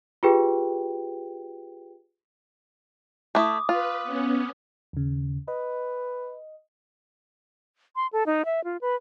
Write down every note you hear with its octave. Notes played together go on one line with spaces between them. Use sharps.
F4 G4 G#4 B4 G5
A3 E4 D6 D#6
F4 B4
B3 C#4
D#2 C#3
B4 D#5
C6
A4
D#4
E5
F4
B4